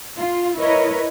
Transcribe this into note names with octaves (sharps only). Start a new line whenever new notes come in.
F4
E4 A#4 B4 C#5 D#5